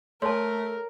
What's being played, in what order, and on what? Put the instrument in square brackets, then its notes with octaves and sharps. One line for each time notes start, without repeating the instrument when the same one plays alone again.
[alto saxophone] A3 [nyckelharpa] A#4 [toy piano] C#5 A5 [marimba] C6